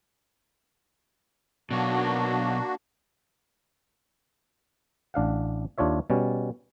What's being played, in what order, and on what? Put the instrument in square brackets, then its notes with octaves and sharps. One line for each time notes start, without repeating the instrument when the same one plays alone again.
[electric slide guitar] B2 F#3 [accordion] A#3 D4 F#4
[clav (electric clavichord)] A1 D4 F5 F#5
D#2 D4 F4 C#5 E5
B2 G3 C#4